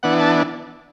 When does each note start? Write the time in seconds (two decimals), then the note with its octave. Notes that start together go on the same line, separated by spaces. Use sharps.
0.03 E3 B3 D4 F#5
0.20 A5